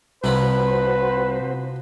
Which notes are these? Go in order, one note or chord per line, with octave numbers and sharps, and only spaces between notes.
C2 C3 F3 C4 E4 F#4 B4 C5